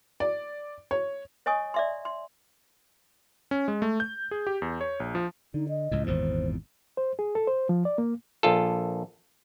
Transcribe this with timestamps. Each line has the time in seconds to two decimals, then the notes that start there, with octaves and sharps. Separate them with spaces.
0.20 D5
0.91 C#5
1.46 C#5 D#5 G#5 C#6 D#6
1.74 D5 E5 C6
2.05 C6
3.51 C#4
3.68 G#3
3.82 A3
4.00 G6
4.31 G#4
4.47 G4
4.62 E2
4.81 C#5
5.00 A#1
5.15 F3
5.54 D3 D#4
5.69 D#5
5.91 C#2 A2
6.06 G#1 E2 A#2 C5
6.97 C5
7.19 G#4
7.35 A4
7.47 C5
7.69 F3
7.85 D5
7.98 A#3
8.43 A#1 F4 A4